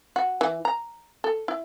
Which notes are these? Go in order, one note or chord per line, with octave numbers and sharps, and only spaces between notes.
F#4
E3
A#5
A4
E4